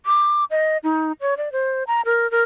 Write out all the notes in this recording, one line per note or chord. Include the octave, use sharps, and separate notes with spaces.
D6
D#5
D#4
C#5
D5
C5
A#5
A#4
A#4